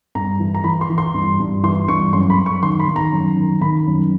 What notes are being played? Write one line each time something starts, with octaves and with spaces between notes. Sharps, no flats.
G2 A#5
E3
A#5
E3 B5
C6
E3
C6
G2
G2
E3 C6
G2 C#6
F#2 C6
B5
F#2
C#6
D#3 C6
B5
D#3
A#5
F#2
D#3
D#3 B5
F#2